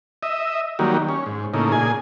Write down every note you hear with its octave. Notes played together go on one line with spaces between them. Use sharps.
D#5 E5
D#3 F#3 G3 A#3
C#4
G#2
A2 C#3 A#3 D#4
A#2 G#4 G#5